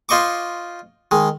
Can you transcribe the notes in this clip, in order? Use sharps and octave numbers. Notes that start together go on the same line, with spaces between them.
F4 C5 D#5 C#6 D6
D#3 G#3